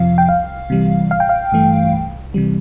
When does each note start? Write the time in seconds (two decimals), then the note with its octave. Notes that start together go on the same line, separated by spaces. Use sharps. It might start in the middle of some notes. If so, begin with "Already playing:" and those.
Already playing: G1 F2 C3 F3 F5
0.18 G5
0.29 C2 F5
0.70 C3 E3 G3
1.11 A1 F5
1.20 G5
1.29 F5
1.52 G2 E3 A3
1.92 C2
2.34 C3 E3 G3